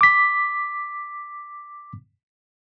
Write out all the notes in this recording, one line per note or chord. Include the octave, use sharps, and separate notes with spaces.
D6 B6